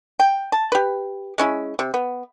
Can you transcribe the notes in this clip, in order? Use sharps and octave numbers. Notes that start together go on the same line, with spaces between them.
G5
A5
G4 B4
G#3 C#4 E4
C3
B3